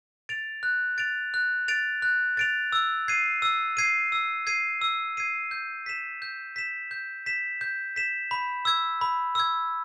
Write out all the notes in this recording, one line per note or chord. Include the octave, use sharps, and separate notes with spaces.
A6 D7 F7
F#6
A6 D7 F7
F#6
A6 D7 F7
F#6
A6 D7 F7
E6
G#6 C7 D#7
E6
G#6 C7 D#7
E6
G#6 C7 D#7
E6
G#6 C7 D#7
G6
B6 E7
G6
B6 E7
G6
B6 E7
G6
B6 E7
B5
E6 G#6
B5
E6 G#6